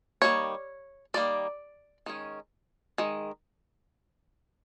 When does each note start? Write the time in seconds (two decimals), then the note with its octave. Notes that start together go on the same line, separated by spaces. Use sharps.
0.22 D#3 G3 A#3 C#5
1.14 D#3 G3 A#3 D5
2.06 D#3 G#3 C#4
2.98 D#3 G#3